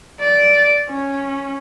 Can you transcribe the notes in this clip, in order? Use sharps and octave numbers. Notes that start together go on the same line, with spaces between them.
D5
C#4